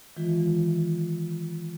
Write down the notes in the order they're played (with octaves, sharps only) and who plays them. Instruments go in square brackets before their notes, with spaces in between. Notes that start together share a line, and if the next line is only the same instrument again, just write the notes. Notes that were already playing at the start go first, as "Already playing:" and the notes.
[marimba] D#3 E3 G#3 F4